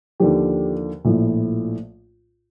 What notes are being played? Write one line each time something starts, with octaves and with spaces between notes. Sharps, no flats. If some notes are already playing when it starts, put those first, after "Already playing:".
D#2 D3 F3 G4
A#1 A2 F3